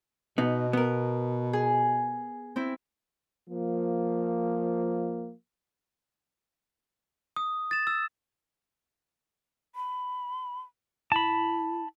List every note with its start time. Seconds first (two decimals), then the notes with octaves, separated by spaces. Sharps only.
0.38 B2 B3 D#4
0.73 B3 A#4
1.53 G#4
2.56 C4 E4
3.48 F3 A#3
7.36 D#6
7.71 A6 E7
7.87 E6
9.75 B5
11.12 E4 A5 B5